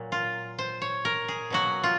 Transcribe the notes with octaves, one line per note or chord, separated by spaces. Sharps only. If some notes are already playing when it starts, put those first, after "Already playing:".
Already playing: A#2 F#3 A#3
F4
C5
C#5
A#4
G#4
B2 F#3 A#3 F#4
F4